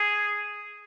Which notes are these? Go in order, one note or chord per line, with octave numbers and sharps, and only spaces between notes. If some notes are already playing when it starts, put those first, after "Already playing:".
Already playing: G#4